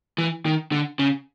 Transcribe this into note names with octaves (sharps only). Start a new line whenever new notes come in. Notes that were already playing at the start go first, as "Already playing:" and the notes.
E3
D#3
D3
C#3